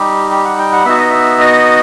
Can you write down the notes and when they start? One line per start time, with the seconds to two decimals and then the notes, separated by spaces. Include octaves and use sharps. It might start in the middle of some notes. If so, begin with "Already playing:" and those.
Already playing: G3 D#4 G4
0.31 G4
0.45 F#5
0.58 G5
0.72 F#5
0.85 B3 D#4 F#4 E5
0.97 D#5
1.10 E5
1.40 D#5